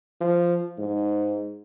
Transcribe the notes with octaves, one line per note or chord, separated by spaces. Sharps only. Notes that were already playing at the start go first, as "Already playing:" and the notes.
F3
G#2